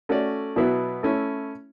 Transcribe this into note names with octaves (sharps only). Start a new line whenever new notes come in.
A3 C#4 F#4 A4 D5
B2 F#3 B3 E4
A3 C#4 E4